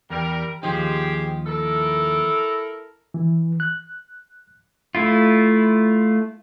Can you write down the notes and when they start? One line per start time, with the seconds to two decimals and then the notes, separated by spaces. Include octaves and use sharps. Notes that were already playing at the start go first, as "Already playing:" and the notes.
0.10 E2 G3 A#4
0.63 D#2 F3 D#4 G4 G#4 C5
1.46 E4 A4 A#4
3.14 E3
3.60 F#6
4.95 A3 E4 F4